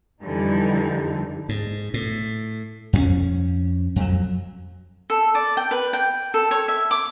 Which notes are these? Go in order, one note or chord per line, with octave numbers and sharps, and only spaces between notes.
F2 D3 E3 F3 G3 D#4
G#2
A2
F2 G3 C#4
F2 F#3
A4
D5
G5
B4
G5
A4
C#5
E5
D6